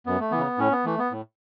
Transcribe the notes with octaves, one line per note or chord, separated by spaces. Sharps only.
F#2 B3
A3
E3 B3
C#3
A2 C#4
B3
E3 A3
B3
A2